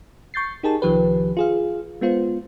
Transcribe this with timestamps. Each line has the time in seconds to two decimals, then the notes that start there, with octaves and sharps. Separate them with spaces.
0.34 C#6 G6 A6 C7
0.63 D#4 G4 G#4 A#4 A5
0.82 C2 D#3 F3 G4 B4
1.37 F4 G#4 F5
2.01 G#3 B3 F4 C5